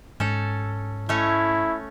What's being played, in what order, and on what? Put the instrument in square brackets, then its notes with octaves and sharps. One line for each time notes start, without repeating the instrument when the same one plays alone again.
[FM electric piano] G#2 [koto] C#4 A4
[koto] A3 C#4 [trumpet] E4